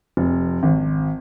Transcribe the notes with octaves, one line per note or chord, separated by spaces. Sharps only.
F1
G#1